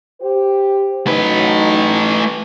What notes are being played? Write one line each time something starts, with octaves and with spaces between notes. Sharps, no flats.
G4 C5
F#3 A3 D#4 B4